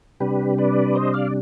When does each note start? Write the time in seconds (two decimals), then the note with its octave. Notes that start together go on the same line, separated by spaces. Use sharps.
0.20 C3 G3 D4 G4 B4
0.58 B4 D5
0.95 C5 D#5
1.14 D5 F5